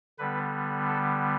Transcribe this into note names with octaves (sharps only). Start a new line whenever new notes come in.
D3 G3 B3 B4
A4